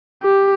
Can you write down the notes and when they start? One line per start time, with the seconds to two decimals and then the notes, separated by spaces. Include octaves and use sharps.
0.23 G4